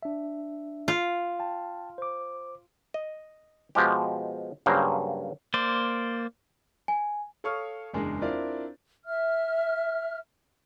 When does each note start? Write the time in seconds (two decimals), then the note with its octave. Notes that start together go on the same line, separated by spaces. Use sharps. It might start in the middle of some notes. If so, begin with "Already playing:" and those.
0.03 D4 E5
0.88 F4
1.40 G5 A5
1.98 C5 D6
2.94 D#5
3.75 B2 F3 G#3 G4
4.66 G2 C#3 F#3 A#3 C5 G5
5.54 A#3 C5 D5
6.88 G#5
7.44 A4 C#5 F5 C#6 D#6 F6
7.94 F#1 E2 G#3 D4 A#4
8.22 C4 D4 E4 F4 A#4 D5
9.05 E5 F6